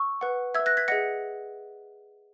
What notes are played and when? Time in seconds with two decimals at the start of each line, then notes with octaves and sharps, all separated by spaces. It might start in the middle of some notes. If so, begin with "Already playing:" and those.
Already playing: C#6 E6
0.21 B4 F#5
0.54 B4 E5 E6 G#6
0.66 F#6 A#6
0.77 G#6 B6
0.88 G#4 D#5 F#5 A#6 C#7